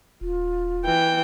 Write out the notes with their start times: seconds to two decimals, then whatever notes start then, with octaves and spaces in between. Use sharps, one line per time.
0.21 D#1 F4
0.85 E3 G5